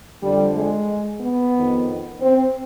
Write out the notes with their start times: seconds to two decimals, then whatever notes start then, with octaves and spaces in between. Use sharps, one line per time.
0.22 F2 D3 G3
0.55 G#3
1.21 B3
1.54 F2 D#3
2.19 C4